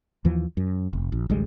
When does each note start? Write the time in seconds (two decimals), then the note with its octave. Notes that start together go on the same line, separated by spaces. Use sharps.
0.25 D#2 E3 F3
0.57 F#2
0.93 F1
1.12 A#1
1.30 A1 D2 G3 G#3